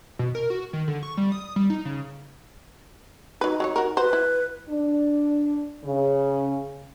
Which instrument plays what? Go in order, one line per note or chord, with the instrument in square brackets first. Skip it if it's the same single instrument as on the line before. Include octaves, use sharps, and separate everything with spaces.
[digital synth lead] B2
A#4
F#4
D#3
D3
C#6
G3
D#6
G3
D#4
C#3
[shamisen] F#3 B4 [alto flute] D#4
[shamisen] F#3 G4 C#5
F#4 A#4
[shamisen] F#4 C5 [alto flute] B4
[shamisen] E4
[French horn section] D4
C#3